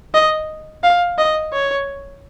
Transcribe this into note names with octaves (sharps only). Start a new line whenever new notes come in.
D#5
F5
D#5
C#5